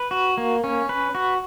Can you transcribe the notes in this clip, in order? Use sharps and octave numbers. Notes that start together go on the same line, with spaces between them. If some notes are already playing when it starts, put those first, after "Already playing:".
Already playing: B4
F#4
A#3
C#4
B4
F#4